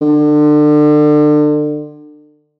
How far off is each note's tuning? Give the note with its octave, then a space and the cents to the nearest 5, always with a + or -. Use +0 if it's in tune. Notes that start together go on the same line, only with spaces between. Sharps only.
D3 +30